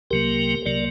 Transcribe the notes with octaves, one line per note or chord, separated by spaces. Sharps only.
C2 C3 F#3 A#3 G4 A#4
C2 C3 F#3 A#3 A#4 D5